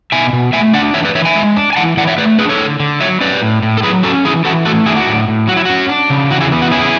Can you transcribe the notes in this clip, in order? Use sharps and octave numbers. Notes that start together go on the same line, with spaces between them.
B2 E5 G#5
B2
A3 E5 G#5
D4 D5 F#5
E3 C#5 E5
B4 D5
E3 C#5 E5
E5 G#5
G#3
D4
G#5
E3 F#5 A5
E3 D5 F#5
C#5 E5
A3 B4 D5
D4 G#4 B4
A4 C#5
D3
D3
F#3 C#5 E5
C#4 B4 D5
A2
A2
A4
F#3 G#4 B4
C#4 F#4 A4
E3 E4 G#4
E3 F#4 A4
A3 F#4 A4
D4 E4 G#4
F#4
A2
A2
F#3 F#4
E4
C#4 F#4
D4
C#3
E3 F#4
E4 G#4
B3
F#4
C#4 E4 G#4